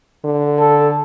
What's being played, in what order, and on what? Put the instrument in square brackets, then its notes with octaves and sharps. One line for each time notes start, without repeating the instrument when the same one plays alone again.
[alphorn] D3
[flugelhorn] A4